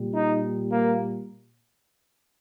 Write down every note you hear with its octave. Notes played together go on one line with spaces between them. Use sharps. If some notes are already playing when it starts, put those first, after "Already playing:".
Already playing: A#2 G3
D#4
A#3